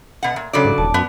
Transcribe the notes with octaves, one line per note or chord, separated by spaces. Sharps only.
B2 F#5
A#2
C#3 F#3 D4 A4 C#5 D5
G#2
D#1 A5
F#2 B3